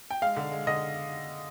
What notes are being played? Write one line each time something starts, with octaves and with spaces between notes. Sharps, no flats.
G5
G#3 F5
D3
G#3
D3 D#5